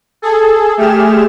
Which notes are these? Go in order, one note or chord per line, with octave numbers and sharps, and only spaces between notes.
G#4 A4
A3 G4 G#4 F6 E7